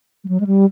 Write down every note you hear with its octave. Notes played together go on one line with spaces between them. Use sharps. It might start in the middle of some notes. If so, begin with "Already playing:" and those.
G3
F#3
G#3
G3